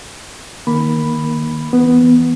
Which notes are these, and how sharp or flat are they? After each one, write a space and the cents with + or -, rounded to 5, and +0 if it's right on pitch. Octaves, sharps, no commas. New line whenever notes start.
D#3 +0 A#3 +10 B5 +0
E3 +0 B3 +0